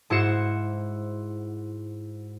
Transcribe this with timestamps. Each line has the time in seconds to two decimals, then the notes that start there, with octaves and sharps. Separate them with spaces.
0.10 G#2 E4 F#4 C5 C#7 E7